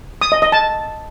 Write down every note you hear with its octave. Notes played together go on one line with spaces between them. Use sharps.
D#6
D#5
D#5
A5